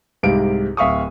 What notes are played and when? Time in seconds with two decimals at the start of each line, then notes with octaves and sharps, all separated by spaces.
0.23 C2 G#2 C3 F5 D7
0.77 D1 E5 F5 C#6 D#6